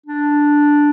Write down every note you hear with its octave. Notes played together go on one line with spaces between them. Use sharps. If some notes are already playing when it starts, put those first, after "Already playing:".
D4